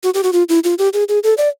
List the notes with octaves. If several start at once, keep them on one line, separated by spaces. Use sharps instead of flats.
F#4
G4
F#4
F4
E4
F4
G4
G#4
G#4
A4
D5